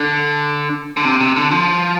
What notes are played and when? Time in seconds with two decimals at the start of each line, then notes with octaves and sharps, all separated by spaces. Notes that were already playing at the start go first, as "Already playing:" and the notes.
Already playing: D3
0.97 D3
1.05 C3
1.21 C3
1.36 D3
1.51 F3